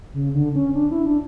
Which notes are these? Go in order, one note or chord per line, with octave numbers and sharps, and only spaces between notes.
C#3
D3
C#4
D4
E4
D4